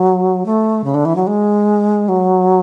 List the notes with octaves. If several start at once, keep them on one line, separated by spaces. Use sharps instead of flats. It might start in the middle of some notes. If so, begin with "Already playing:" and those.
Already playing: F#3
A3
C#3
D3
E3
F#3
G#3
F#3